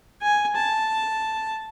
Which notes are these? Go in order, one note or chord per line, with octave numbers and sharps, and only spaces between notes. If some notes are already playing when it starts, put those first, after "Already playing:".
G#5
A5